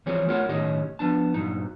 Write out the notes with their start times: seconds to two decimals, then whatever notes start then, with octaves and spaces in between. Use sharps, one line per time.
0.06 E3 F3 G3 C4 G#4 C#5
0.27 A3 F4 A#4 C#5 F#5
0.49 B1 A2 D#3 C#4 G4 D#5
0.99 F3 B3 D4 A5
1.34 G2 A#2 F#3 D#4